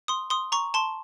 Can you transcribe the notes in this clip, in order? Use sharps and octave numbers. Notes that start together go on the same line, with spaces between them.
C6 D#6
C6 D#6
A#5 C#6
A5 C6